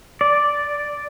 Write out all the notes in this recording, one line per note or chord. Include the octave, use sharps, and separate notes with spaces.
D5